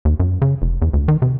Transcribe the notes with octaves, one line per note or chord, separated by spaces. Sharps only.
D#2
F#2
C#3
F1
E2
D2
D#3
C3